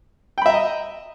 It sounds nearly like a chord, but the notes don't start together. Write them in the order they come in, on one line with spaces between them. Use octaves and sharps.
G5 B5 E5 A#5 D#5